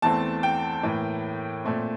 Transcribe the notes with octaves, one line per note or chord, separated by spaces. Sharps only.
E2 E3 A3 C4 A5
G5
A2 E3 A#3
A#2 A3 C4